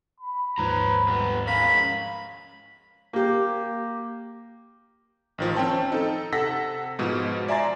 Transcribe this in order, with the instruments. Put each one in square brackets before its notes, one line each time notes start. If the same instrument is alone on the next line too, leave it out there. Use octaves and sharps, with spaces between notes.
[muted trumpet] B5
[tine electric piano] D#2 G#2 F3 [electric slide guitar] B4 C#5 A#5
[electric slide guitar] G2 B3
[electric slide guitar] G#3 C#4 A#4 [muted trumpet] F5 [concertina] B5
[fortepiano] A#3 G4
[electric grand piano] A1 D#3 F3
C4 C#4 G5 A5
D#4 A4
C3 A4 F#5 E6 A#6 B6
G#2 B2 F3
D5 E5 G#5 A#5 C6 A6